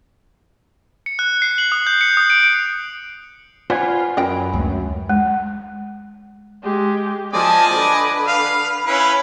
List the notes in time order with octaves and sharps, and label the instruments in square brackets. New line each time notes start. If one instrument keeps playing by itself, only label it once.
[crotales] C#7
F#6
C7
F#7
D#6
G6
C#7
D#6
D7
[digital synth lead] F4 [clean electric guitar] B4 F#5 G#5 [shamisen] C5 D5
[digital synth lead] F#2 [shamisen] F4 A#4 G5
[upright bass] D2 G#3
[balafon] G#3
[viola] G#3 G4
[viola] F3 A5 [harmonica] D5 D#5 G#5
[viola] D3 B4
[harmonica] F5
C#4 E4 B4